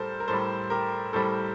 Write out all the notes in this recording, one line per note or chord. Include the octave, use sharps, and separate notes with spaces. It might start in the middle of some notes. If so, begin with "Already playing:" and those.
Already playing: A2 G3 A4 A#4 C5
A#4
A2 G3 A4 C5
G4 A#4
A2 G3 A4 C5